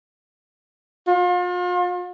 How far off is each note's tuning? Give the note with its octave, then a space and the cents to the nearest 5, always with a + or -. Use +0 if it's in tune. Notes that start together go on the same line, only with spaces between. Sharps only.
F4 +40